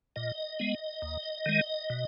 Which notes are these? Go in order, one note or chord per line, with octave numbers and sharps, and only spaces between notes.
A#2 D#5
G#3 B3
D#2
D#3 G#3
B2